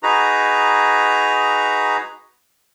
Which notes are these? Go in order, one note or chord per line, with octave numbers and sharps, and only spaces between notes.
D#4 F#4 G#4 B4 A#5